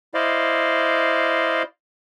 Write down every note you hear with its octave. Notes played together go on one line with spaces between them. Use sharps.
E4 C5 D5 D#5 F5